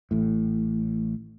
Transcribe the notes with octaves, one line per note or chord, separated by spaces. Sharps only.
A1 A2